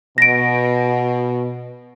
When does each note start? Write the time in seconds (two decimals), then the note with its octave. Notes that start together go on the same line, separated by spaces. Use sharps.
0.18 B2 A#6 D7